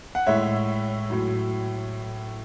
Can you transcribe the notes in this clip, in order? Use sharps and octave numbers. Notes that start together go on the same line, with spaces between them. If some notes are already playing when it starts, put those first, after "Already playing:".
F#5
A2 G#3 C#5 E5
A2 F#3